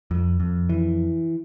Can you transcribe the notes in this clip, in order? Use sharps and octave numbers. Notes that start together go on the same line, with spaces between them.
F2
F2
E3